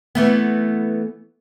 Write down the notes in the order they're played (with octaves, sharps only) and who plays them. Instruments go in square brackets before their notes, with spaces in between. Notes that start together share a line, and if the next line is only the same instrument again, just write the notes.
[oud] E3 A3 B3